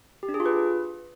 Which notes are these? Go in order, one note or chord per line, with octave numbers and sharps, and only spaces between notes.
G4
D4
G#4
F4
B4